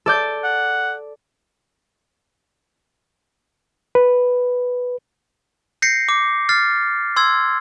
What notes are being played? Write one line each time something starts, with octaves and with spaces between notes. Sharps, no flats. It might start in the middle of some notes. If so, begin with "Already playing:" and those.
A4 D5 G6
F#5
B4
G6 A#6 C7 C#7
D6
F6 A6 C7
C6 E6 G#6